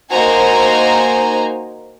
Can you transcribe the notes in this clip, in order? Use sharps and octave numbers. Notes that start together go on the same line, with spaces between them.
A#3 D#4 F#4 C5 G#5 A#5